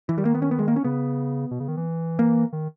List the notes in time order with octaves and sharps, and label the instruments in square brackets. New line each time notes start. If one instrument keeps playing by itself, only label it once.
[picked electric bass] E3
[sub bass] D#3 [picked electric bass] G3
[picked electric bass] A#3
B3
C#4
B3
G#3
A#3
C#4
[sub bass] C#3 [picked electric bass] B3
[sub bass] B2
C#3
D#3
E3
[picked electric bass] A#3
[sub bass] D#3